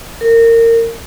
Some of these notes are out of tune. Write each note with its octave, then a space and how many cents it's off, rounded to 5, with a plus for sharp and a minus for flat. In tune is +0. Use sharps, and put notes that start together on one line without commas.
A#4 -25